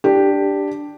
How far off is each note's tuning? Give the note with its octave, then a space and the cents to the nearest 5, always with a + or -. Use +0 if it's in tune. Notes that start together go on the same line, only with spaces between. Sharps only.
D4 +0 G4 +0